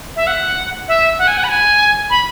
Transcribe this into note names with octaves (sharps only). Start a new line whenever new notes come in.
E5
F#5
E5
F#5
G#5
F#5
B5
G#5
B5